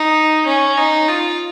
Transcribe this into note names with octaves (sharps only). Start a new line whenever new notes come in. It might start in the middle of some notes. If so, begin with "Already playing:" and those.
Already playing: D#4
C#4
D#4
F4